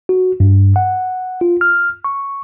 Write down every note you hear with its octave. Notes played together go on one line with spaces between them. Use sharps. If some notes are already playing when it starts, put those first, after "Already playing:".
F#4
G2
F#5
F4
F6
C#6